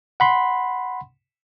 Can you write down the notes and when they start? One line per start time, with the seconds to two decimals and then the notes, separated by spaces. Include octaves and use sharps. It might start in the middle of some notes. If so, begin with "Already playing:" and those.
0.20 F#5 B5 C6